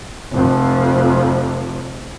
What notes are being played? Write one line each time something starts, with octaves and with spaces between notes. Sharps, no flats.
F1 F2